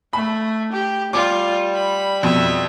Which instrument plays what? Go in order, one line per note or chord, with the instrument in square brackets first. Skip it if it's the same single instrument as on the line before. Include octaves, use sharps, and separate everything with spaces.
[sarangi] A3 [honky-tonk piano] B5
[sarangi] G4
[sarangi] G3 [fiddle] F4 [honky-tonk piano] D6
[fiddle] B5
[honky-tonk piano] F2 B2 [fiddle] E5